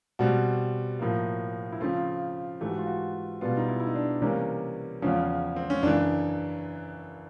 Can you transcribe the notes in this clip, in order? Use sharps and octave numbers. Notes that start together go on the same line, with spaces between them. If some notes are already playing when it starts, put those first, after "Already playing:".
B2 G3 C4 F#4
A2 F3 A#3
E4
C#3 F3 A3 C4 F4
G#2 E3 A3 G4
F#4
F4
F#4
B2 G3 B3 F4
D#4
E4
E4
D#4
D4
C3 E3 G3 A#3 C#4
E2 C#3 F3 C#4
C4
C#4
F#2 C#3 E3 D4